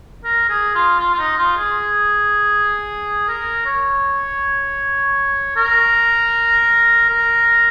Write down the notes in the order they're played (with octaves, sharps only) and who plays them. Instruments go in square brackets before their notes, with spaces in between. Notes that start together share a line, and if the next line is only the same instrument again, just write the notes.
[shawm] A#4
G#4
F4
F4
F4
D#4
F4
G#4
A#4
C#5
A#4
A#4